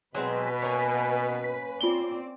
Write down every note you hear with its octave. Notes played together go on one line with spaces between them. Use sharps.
B2 F#3 G#3 C4 B4
A#3 C#4
B6
C4 F4 D5 G7